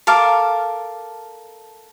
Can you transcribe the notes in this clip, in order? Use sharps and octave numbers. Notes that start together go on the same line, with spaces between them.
A4 A#4 F5 D6